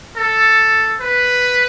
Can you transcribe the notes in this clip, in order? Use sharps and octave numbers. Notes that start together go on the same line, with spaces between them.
A4
B4